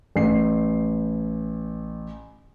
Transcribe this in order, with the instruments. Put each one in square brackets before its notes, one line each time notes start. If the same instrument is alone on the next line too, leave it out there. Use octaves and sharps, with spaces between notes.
[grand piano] A1 C7